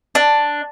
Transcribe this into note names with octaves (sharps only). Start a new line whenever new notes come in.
D4